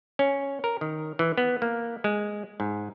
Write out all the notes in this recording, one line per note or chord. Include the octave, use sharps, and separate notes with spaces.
C#4
A#4
D#3
E3
B3
A#3
G#3
G#2